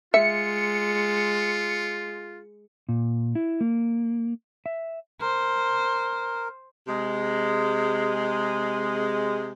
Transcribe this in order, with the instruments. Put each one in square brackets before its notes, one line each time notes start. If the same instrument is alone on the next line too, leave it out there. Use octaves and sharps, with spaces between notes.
[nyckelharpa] G#3 [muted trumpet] F4 [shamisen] E5 [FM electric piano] C#7
[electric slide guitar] A#2
E4
A#3
E5
[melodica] A#4 [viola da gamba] C5
[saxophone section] C3 G#3